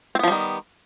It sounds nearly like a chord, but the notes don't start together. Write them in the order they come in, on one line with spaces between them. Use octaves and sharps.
C4 B3 F3 G3 D#3